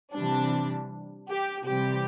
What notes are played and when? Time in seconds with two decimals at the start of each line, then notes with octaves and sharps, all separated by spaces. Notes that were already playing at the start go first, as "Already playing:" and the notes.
0.14 C3 E3 G3 D4
1.29 G4
1.66 C3 E3 G3 G4